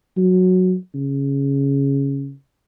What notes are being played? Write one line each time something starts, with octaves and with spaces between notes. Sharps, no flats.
F#3
C#3